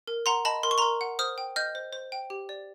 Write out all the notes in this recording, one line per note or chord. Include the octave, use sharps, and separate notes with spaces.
A#4
F#5 A#5 C6
D#5 A5 B5
A#4 C6
C#6
A#4 A#5 C6
F#5
C5 D#6 F6
G5
D#5 F6 G6
C5
C5
G5
G4
D5